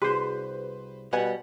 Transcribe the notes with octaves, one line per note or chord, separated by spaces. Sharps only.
C2 F#4 G#4 B4 C5
B2 G3 F#5 G#5